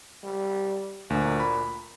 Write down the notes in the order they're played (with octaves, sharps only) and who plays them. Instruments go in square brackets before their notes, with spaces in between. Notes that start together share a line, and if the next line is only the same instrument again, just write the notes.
[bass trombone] G3
[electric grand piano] D2 [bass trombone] A#2
[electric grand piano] B5